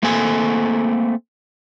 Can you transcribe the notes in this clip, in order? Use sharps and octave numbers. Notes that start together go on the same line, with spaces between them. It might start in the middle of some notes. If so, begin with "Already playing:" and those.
A3 A#3 C4 A4 G#5